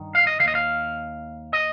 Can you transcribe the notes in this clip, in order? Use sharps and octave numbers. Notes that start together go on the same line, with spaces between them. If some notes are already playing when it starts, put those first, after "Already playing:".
Already playing: G2 D#3
F5
D#5
D#3 F5
D#2 D#5
F5
D#5